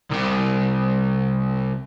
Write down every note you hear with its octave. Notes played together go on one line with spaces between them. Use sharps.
C2 C3